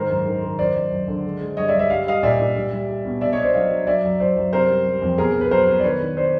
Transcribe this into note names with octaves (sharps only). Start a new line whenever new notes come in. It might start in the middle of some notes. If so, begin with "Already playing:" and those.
Already playing: G#2 D#3 A#4 C5
F#2
D#3
D#3
F#2 C5 D5
F#2
F#2
D3
G#3
G#3
G2 C#5 D#5
D5 E5
G2
D5 E5
G3 F5
G3 D#5 F5
A#2 D5 E5
A#2
G3
G3
G3
B2
B2 D5 E5
C#5 D#5
B2
C5 D5
F#3 D#5 F5
F#3
F#3 D5 E5
F#2
F#2 C5 D5
F#2
C3 A#4 C5
G3
G3
F2
B2 G#4 A#4
B2
B4
F#3 A#4 C5
B2
D5
D#3 B4 C#5
D#3
C5 D5